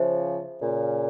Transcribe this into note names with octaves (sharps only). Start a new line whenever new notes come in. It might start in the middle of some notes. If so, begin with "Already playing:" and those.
Already playing: C#3 F3 C5 E5
A#2 C#3